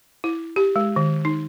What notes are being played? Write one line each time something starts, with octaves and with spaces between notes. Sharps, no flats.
E4
G4
G#3
D#3
D#4